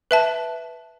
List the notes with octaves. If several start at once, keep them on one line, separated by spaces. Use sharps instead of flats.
B4 E5 A5